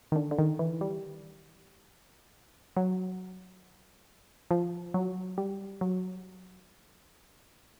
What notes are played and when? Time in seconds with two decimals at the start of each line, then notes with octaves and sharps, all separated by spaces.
0.12 D#3
0.16 D3
0.31 D3
0.39 D#3
0.59 E3
0.81 G3
2.77 F#3
4.51 F3
4.94 F#3
5.38 G3
5.81 F#3